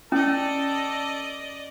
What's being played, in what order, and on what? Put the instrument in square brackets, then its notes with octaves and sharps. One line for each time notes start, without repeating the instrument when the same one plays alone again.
[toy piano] C#4 [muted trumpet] A4 [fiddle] D5 D#5